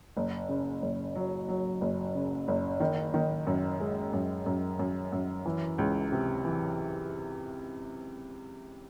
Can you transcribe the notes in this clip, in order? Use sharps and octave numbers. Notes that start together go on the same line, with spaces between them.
F#1
C#3
F#1
F#3
F#3
F#1
C#3
F#1
D#3
D#3
F#2
G#3
F#2
F#2
F#2
F#2
E3
C#2
C3
E3